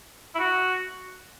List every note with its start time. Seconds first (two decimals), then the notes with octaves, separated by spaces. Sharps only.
0.35 E4
0.39 F#4